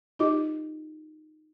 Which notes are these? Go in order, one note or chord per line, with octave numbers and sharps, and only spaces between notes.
D#4 F4 G4 D#5 D6